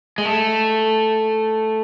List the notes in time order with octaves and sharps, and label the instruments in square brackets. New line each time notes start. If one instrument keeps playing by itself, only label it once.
[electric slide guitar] G#3
A3